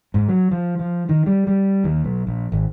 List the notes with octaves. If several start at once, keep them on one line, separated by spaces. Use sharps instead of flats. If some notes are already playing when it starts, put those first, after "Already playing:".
G#2
F#3
F3
F3
D#3
G3
G3
D#2
B1
A#1
G#1